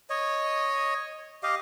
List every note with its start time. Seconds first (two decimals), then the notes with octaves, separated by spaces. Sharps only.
0.10 C#5 D#5
1.43 G4 D#5 F5